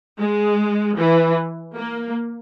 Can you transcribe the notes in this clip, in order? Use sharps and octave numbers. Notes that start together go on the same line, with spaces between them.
G#3
E3
A#3